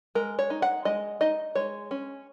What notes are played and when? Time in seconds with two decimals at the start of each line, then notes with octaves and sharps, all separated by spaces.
0.15 G#3 A#4
0.39 C#5
0.50 D#4
0.62 F#5
0.85 G#3 D#5
1.21 D#4 D#5
1.55 G#3 C#5
1.91 C#4